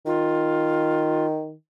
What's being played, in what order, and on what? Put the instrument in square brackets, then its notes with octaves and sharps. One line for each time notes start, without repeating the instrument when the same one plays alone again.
[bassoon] D#3 [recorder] F4